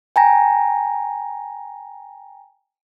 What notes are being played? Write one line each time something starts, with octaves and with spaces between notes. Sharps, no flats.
G5 G#5 A#5 A#6